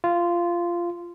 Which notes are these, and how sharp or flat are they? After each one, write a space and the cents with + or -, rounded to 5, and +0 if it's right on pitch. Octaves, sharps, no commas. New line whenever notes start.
F4 -15